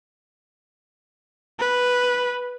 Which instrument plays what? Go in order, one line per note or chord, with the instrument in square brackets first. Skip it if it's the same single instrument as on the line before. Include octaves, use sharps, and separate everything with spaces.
[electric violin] B4